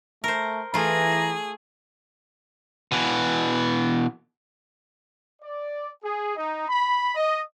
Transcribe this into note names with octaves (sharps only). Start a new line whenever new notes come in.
A3 A#4 C5
E3 A3 F4 G#4 A#5
B2 E3
D5
G#4
D#4
B5
D#5